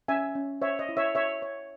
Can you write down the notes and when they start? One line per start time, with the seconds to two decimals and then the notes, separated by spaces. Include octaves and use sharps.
0.08 C#4 E5 G#5
0.35 C#4
0.62 C5 C#5 E5
0.79 D#5
0.89 E4
0.97 C#5 E5
1.15 C#5 E5
1.42 C#5